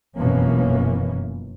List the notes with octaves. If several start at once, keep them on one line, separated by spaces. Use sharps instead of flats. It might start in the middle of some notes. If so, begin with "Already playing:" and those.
F1 F#2 B2 E3 A#3 C#4